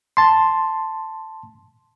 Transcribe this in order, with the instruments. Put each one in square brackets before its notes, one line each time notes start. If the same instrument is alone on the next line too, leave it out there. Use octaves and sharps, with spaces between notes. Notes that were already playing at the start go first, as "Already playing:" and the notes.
[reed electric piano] A5 C6